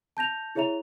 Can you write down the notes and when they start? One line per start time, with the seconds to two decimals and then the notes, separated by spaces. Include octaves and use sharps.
0.17 A5 G6 A#6 F7
0.55 E4 G#4 C#5 E5 A#5 F7